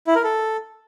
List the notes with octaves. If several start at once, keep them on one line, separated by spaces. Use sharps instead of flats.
E4
A#4
A4